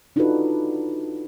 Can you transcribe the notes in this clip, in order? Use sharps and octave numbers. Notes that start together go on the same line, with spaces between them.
D4 D#4 F4 F#4 A4 B4